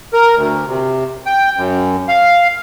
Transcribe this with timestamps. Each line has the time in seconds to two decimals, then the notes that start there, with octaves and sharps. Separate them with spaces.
0.13 A#4
0.36 D2
0.68 C3
1.26 G5
1.57 F#2
2.08 F5